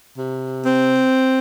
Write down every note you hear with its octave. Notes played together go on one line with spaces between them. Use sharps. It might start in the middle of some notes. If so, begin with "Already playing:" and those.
C3
C4